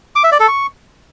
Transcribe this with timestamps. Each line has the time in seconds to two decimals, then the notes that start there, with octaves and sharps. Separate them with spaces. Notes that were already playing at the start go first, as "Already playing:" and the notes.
0.16 D6
0.24 E5
0.32 D5
0.40 A4
0.48 C#6